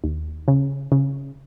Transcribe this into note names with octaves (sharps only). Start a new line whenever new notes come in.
D#2
C#3
C#3